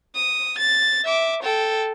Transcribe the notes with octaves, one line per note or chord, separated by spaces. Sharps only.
D#6
A6
E5 D6
A4 G5